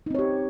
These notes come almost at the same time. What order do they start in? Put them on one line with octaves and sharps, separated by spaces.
D#4 C4 C#5 G4